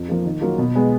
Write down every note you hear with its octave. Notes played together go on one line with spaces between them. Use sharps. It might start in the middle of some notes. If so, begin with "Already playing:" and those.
Already playing: F2
F3 A#3 F4
D#3
F#3 A#3 F4
B2
G#3 B3